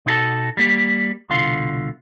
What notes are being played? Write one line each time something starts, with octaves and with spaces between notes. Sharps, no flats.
B2 D#4 E4 F#4 A4 A5
G3 A#3 G4
C2 B2 D3 F4 F5 C6